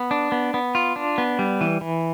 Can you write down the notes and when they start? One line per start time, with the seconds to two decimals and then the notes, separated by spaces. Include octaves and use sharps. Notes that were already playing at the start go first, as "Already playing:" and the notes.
Already playing: B3
0.11 D4
0.32 B3
0.54 B3
0.75 F4
0.96 D4
1.18 B3
1.39 G3
1.61 E3
1.81 E3